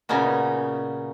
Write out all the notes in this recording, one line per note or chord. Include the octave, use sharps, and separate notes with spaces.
A#2 C#3 B3 C#4 D#4 F#4